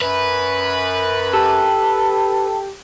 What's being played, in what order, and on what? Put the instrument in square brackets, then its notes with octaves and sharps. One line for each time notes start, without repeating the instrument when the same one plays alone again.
[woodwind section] F#2 [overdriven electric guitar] B4
[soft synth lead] G4 [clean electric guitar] A4